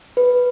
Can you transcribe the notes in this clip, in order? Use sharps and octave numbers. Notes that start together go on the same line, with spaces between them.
B4